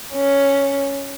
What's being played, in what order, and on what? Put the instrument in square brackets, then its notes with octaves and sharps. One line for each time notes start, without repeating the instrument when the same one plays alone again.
[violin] C#4